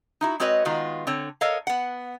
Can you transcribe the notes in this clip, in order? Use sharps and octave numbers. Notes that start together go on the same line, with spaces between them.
D#4 E4 F#4
G#3 C4 F#4 B4 C#5 D#5
D#3 G#3 B3 F4 F#4
D3 C4 C#5
A4 A#4 C#5 D#5 F5
B3 F#5